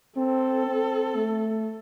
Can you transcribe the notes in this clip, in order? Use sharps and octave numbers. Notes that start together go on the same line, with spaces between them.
C4 A4
C4
A3